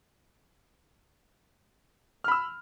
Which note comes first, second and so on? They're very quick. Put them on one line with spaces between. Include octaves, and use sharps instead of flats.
F6 B5 E6